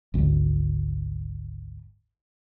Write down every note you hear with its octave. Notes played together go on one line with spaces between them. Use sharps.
G#1 D2